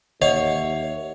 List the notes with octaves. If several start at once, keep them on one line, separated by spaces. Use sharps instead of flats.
D#2 C#5 D#5 E5 F#5 C7